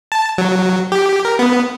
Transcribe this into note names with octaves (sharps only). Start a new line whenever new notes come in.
A5
F#3
G4
A#4
B3